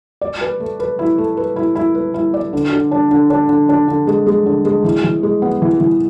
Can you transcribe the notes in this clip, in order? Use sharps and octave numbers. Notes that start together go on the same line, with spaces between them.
D5
B4
A3
B4
E4
A3
B4
E4
E4
B4
E4
D5
D3
D3
D4
D3
D4
D3
D4
D3
G#3
G#3
D3
G#3
E3
E3
G#3
B3
E3
E3